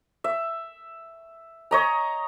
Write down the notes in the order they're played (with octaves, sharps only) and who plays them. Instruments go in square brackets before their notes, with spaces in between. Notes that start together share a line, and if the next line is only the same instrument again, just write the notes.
[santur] E5
C#5 D#5 A#5